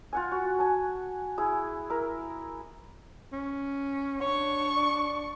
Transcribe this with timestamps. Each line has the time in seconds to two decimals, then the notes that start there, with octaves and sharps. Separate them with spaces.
0.13 F4 F#5 G#5
0.32 F#4
0.59 G#5 A5
1.38 E4 G#4
1.90 E4 A#4 E5
3.32 C#4
4.21 D4 C#5 C#6
4.76 D5